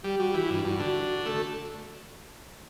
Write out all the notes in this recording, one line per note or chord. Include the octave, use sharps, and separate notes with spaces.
G3 G4
G3 F#4
E3 F#4
E4
G2 D4
G2 F#4
D3 F#4
A3 A4